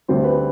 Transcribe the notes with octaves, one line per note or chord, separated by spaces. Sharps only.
D2 D3 G3 C4 C5
B4